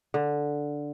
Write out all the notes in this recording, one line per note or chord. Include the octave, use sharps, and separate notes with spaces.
D3